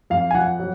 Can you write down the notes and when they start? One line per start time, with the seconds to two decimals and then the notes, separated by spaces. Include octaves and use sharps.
0.10 F2 F5
0.31 G#5
0.35 F3 F#5
0.60 F#3